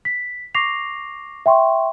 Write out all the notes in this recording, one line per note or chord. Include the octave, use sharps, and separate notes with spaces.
B6
C#6 D6 A#6 C7 F7
E5 G5 C6 C#6